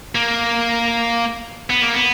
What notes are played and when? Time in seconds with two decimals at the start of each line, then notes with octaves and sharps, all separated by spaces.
0.15 A#3
1.70 B3
1.82 A#3
1.94 B3